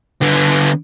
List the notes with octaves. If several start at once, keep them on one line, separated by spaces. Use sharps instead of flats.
D3 B3